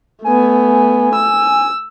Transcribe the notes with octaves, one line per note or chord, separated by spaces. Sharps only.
A3 B3 G#5
E6